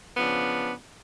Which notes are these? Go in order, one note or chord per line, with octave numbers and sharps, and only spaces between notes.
C#3 F3 B3 D4